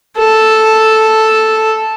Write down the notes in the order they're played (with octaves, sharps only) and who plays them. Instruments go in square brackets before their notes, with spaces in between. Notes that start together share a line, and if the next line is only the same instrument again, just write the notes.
[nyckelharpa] A4